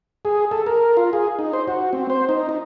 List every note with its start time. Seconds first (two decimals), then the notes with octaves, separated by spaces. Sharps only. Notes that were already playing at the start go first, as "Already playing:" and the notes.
0.25 G#4
0.51 A4
0.66 A#4
0.97 F4
1.13 G#4
1.39 D#4
1.53 C5
1.67 F#4
1.93 C4
2.10 C5
2.29 D#4
2.49 D#4